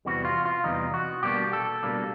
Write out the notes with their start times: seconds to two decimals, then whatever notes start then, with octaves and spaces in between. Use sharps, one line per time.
0.05 E2 C3 E3 G3 F#4
0.25 F4
0.45 F4
0.64 E2 C3 E3 G3 D#4
0.94 F#4
1.23 B2 G3 A#3 D4 G4
1.53 A4
1.83 B2 G3 A#3 D4